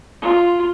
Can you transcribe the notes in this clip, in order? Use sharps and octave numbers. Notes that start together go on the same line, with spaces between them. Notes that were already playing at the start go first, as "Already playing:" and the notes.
F4